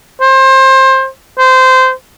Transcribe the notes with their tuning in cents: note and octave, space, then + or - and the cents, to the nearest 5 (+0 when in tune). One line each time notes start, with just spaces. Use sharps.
C5 +25
C5 -20